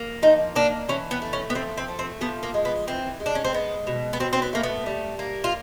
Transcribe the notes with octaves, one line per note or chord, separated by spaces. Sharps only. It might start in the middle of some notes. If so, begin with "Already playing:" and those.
Already playing: A#3
F3 D#4
A#3 D4
E3 C#4
B3
A3
C#4
B3
F3 C4
C4
A3
C4
F3 B3
A#3
G#3
B3
E3 C4
G#3
D4
C#4
C4
G#3 B3
B2
B3
F#3 C4
C4
B3
A3 A#3
B3
G3
A#3
F4